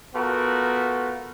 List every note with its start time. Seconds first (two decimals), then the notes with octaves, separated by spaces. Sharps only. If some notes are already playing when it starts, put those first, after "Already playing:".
0.15 A3 B3 F4 F#4 A#4